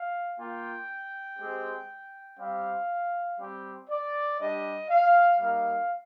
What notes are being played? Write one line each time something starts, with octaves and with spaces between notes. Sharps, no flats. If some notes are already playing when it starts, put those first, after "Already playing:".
Already playing: F5
A#3 F4 G5
G#3 C4 G4
G3 C4 G4 F5
G3 C4 G4
D5
G3 D4 G4 D#5
F5
G3 A#3 D#4 F5